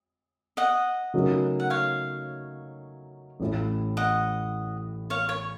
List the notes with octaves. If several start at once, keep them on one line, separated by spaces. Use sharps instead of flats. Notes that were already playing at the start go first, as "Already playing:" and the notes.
D#5 F#5
C#3 F#3 A3 D#4 A#4
F#5
C#5 F5
A1 A2 A3
D#5 F#5
C#5 F5
C#5